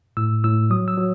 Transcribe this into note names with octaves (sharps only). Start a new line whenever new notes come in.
A2 E6
A2 E6
F#3 D#6
E6
F#3